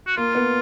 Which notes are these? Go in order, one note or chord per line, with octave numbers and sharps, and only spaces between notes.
F#4
A#3 F4
B3